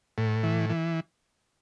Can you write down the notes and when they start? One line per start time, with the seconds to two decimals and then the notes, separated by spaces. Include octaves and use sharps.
0.18 A2
0.43 E3
0.70 E3